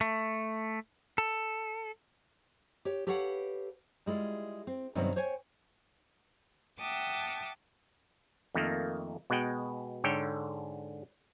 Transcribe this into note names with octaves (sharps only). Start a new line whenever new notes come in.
A3
A4
G4 C#5
G4 A4 B4 C#5 F5 F#5
G3 G#3 E4 F4
C4
G2 C3 D#3 F#3 B3 C4
C5 C#5 G5 G#5
E5 F#5 G5 A5 D6 D#6
F2 D#3 A3 A#3
B2 G#3 F#5 G5
G#2 D3 A4 C#5 G5